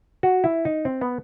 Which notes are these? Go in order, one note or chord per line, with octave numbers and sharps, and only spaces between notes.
F#4
E4
D#4
C4
B3